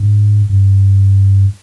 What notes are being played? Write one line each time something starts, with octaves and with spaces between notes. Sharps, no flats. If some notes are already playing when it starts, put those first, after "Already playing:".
Already playing: G#2
G2